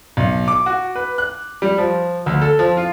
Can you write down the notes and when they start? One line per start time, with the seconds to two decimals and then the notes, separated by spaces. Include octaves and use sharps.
0.17 B1
0.48 D6
0.66 F#4
0.95 B4
1.18 F#6
1.62 G3
1.78 F3
2.26 D2
2.42 A4
2.59 F3
2.77 F4